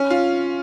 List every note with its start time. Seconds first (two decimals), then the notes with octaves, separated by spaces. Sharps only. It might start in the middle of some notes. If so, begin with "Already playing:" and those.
Already playing: C#4
0.10 F4